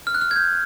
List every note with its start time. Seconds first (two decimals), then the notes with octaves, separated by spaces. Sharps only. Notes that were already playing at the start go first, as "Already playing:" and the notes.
0.07 F6
0.15 F#6
0.21 F6
0.31 G#6
0.36 G6